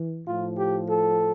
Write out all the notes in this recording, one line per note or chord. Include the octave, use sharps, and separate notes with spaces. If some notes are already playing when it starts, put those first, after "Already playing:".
Already playing: E3
A2 F3 F4
G4
A4